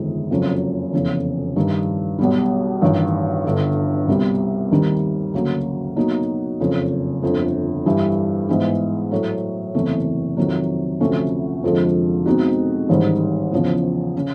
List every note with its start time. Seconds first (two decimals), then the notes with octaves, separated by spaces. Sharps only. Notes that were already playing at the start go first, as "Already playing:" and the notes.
Already playing: G1 F2 C3 D#3 G#3
0.31 F#1 F2 C#3 F#3
0.93 F1 E2 C#3
1.56 G2 D#3 G3
2.19 B1 B2 G3
2.82 A1 G2 D#3
3.45 G1 G2 D3
4.08 C2 B2 G3 C4
4.71 D#2 D#3 G3 C4
5.34 D2 C#3 F#3 A#3
5.96 B2 F#3 A#3 D#4 F#4
6.60 F#1 F2 C#3
7.22 G1 F2 D3
7.86 G2 E3 G3
8.49 G#2 E3 G#3 B3
9.11 A2 F#3 A3
9.74 F#1 E2 C3 E3 A3
10.37 F2 C3 D#3 F#3
11.00 D2 C3 F3 A3 C#4
11.63 F1 F2 D3 F3 G#3
12.26 B2 G#3 C4 D#4 F#4
12.89 A1 G#2 D#3 G3
13.52 E2 C#3 F3
14.17 C#3